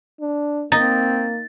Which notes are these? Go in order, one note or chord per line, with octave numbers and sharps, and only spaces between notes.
D4
A#3 C4 D#4 A6